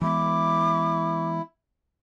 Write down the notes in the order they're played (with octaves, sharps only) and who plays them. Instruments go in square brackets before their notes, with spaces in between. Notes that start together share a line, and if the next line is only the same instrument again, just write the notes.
[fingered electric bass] E3 G#3 B3 [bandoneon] E4 [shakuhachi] D6